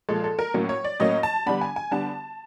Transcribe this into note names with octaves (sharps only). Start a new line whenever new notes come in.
A#2 F3 G#3 A4
A4
A#4
A2 F#3 A#3 C#4
C#5
D5
A2 F#3 A#3 C#4 D#5
A5
D3 G3 B3 D4 B5
G#5
G#5
D3 G3 B3 D4 A5